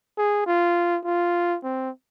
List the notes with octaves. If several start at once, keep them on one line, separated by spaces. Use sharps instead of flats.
G#4
F4
F4
C4